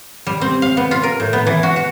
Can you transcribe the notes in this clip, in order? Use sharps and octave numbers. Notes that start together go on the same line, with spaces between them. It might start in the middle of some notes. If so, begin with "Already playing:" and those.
G3
C4
F5
B3
F4
A#4
A2
B3
E3
F#4
F#4